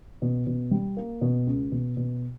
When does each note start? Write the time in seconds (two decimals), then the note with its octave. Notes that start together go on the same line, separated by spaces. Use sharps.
0.22 B2
0.47 B2
0.71 G3
0.97 A#3
1.21 B2
1.47 C#2
1.72 B2
1.97 B2